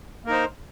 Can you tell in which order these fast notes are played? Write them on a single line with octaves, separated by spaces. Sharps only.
A#3 A#4 D#4 C5